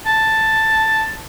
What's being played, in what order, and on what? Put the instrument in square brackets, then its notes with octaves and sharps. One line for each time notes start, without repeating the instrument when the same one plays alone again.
[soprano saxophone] A5